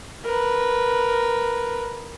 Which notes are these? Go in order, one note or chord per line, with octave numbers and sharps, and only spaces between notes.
A#4 B4